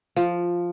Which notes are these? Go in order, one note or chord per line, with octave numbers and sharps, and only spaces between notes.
F3